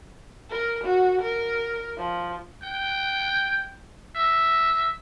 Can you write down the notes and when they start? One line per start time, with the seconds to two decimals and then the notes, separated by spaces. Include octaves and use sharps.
0.50 A#4
0.84 F#4
1.21 A#4
1.97 F3
2.63 G5
4.15 E5